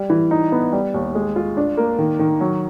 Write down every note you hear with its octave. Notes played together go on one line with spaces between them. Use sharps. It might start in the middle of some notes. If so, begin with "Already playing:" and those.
Already playing: G3
E3
D#4
B3
G3
D#2
G#3
F4
D4
A#3
D#3
D#3
F#3